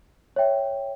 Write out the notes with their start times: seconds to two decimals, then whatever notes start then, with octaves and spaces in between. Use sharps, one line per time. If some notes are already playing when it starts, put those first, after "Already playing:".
0.36 C#5 E5 G5